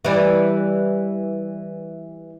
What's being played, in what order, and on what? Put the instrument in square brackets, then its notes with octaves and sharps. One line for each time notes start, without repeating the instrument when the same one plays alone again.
[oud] E3 G3